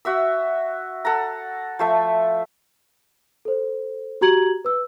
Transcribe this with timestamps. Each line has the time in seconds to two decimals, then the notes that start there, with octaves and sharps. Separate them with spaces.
0.05 F#4 E5 E6
1.05 A4 F#5 A#5
1.79 F3 A3 E5
3.45 A4 C5
4.21 F#4 G4 A#5 G#6 F#7
4.65 B4 E6